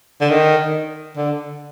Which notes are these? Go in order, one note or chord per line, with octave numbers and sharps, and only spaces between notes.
D3
D#3
D3